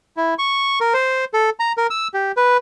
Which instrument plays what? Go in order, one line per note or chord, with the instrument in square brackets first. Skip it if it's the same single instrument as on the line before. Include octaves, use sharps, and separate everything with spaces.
[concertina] E4
C#6
A#4
C5
A4
A#5
A#4
E6
G4
B4